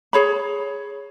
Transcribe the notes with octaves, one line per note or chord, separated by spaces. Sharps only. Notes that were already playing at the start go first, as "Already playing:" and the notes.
G#4 C#5 B5